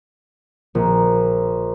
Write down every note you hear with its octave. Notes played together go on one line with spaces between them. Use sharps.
A#1